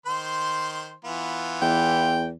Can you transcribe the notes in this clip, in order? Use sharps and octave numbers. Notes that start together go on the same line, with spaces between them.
D#3 C5 C6
E3 B3 F4
E2 G5